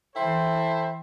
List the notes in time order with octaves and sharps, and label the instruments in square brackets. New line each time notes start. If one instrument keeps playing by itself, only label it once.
[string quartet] E3 [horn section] E4 A4 C5 [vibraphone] G5